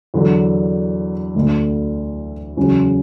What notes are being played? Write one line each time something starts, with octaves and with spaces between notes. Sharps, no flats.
E2 D3 F#3
D2 D3 A3
E2 C#3 F#3 C#4 F#4